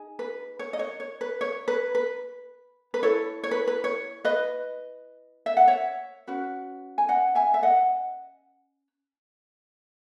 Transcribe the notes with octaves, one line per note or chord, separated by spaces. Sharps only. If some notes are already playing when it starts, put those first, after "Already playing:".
Already playing: D#4 G#4
B4
C#5
D#5
C#5
C#5
B4
C#5
B4
B4
B4
E4 A4 C#5
C#5
B4
B4
C#5
B4 D#5
E5
F#5
C#5 E5
C#4 F#4 B4
G#5
D#5 F#5
E5 G#5
E5
D#5 F#5